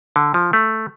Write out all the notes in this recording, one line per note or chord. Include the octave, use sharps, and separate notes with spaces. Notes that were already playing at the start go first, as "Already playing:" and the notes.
D3
F3
A3